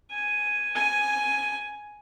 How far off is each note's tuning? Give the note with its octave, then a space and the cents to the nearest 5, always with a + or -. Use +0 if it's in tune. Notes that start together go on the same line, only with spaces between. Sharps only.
G#5 +0
G#5 +5